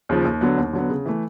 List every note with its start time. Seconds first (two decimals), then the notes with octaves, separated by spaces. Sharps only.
0.09 D#2 C#3 F3
0.25 D#2
0.41 D3 F#3 B3
0.58 D#2
0.73 D3 F#3 B3
0.90 C#3
1.06 E3 A3